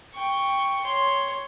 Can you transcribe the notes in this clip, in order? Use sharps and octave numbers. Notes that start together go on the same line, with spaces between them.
G5 C#6
C#5 C6